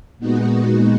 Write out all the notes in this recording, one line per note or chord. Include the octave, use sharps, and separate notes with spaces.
A#2 G#3 B3 D#4 F#4